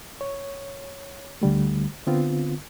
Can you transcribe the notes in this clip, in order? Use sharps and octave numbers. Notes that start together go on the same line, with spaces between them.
C#5
D2 D3 G3 A3
D3 B3 C4 F4